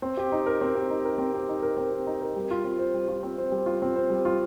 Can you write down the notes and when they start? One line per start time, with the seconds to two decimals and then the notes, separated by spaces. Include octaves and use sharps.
0.02 C4
0.17 G4
0.32 D#4
0.46 A#4
0.61 C4
0.75 G4
0.90 D#4
1.05 A#4
1.18 C4
1.34 G4
1.49 D#4
1.62 A#4
1.77 C4
1.92 G4
2.07 D#4
2.21 A#4
2.36 G3
2.51 F4
2.64 C4
2.79 C5
2.94 G3
3.08 F4
3.23 C4
3.38 C5
3.52 G3
3.66 F4
3.82 C4
3.96 C5
4.10 G3
4.25 F4